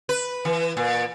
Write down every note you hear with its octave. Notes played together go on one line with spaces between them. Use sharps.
B4
E3
A#2